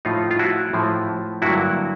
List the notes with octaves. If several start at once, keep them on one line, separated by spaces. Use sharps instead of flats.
A2 F3 A3 D#4 F4
F4
E4 F#4
A2 F3 A3
G2 D3 F#3 A#3 E4 F#4